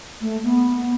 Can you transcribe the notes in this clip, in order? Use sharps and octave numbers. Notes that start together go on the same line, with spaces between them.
A3
B3